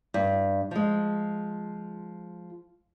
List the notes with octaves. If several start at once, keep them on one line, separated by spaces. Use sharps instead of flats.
G2
F3 G#3